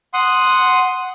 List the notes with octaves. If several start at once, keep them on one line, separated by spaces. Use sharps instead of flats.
F#5 C6 D#6